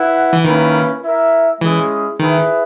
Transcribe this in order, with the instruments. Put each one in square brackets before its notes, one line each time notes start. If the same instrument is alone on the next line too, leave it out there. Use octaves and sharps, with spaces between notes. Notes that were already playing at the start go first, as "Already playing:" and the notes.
Already playing: [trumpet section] E4 B4 F#5
[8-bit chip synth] E3
[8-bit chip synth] D#3 [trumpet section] A#3 C#4 E4 B4
[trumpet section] E4 A#4 E5
[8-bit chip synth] E3 [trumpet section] G#3 C#4 E4 G#4
[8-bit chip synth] D#3 [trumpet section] E4 G#4 B4 E5